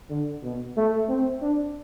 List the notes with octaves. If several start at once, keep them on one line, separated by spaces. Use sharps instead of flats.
D3
B2
A3
C4
D4